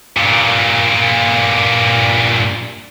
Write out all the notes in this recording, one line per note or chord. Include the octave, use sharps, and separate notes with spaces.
G2 A#2